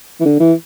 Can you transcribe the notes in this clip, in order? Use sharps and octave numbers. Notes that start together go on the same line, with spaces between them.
E3
D3
E3